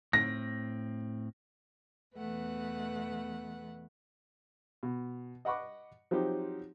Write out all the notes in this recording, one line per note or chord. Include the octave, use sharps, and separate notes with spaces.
A2 C4 A#6
E2 B2 E3 A3 B4 F#5
B2
D#5 F#5 B5 C#6 D6
F3 F#3 C4 D#4 G4